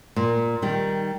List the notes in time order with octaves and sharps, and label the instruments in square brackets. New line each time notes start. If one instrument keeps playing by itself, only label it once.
[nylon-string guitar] A#2
D#3 G3